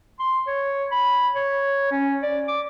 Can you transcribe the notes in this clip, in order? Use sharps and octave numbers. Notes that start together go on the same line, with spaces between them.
C6
C#5
B5
C#5
C#4
D5
D6